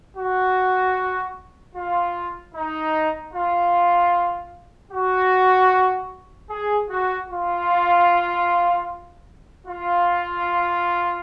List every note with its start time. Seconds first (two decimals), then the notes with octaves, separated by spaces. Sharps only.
0.17 F#4
1.76 F4
2.55 D#4
3.34 F4
4.92 F#4
6.50 G#4
6.89 F#4
7.29 F4
9.66 F4